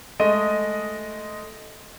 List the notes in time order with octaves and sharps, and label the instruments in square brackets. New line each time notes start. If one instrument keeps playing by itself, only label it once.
[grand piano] G#3 A3 D#5 D#7